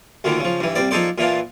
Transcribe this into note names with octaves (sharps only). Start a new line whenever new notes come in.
D2 A#2 D3 D#3
C#3 F3
G2 E3
C2 C4 D5
F3 D#4 G#4 A4 C5 D5
A#2 E3 D4 F4